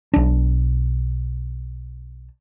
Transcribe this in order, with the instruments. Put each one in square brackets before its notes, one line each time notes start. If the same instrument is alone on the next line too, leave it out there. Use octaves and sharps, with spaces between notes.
[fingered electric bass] B1 D4